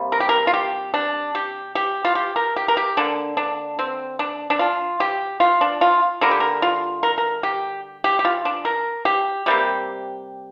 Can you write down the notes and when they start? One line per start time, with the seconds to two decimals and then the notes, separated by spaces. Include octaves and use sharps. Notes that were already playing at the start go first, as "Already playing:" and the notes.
Already playing: C3 G3 A#3
0.12 A#4
0.20 G4
0.29 A#4
0.47 F4
0.54 G4
0.94 D4
1.35 G4
1.75 G4
2.05 F4
2.15 G4
2.36 A#4
2.56 G4
2.68 A#4
2.77 G4
2.97 D3 A#3 D4
3.37 D4
3.79 C4
4.19 D4
4.50 D4
4.59 F4
5.00 G4
5.40 F4
5.61 D4
5.81 F4
6.21 D3 G3 A#3 A#4
6.31 G4
6.40 A#4
6.62 F4
7.03 A#4
7.18 A#4
7.43 G4
8.04 G4
8.19 G4
8.25 F4
8.45 D4
8.65 A#4
9.05 G4
9.46 C3 G3 A#3 G4